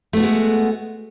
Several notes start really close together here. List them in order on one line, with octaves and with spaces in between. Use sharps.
A3 B3 F#4 G#3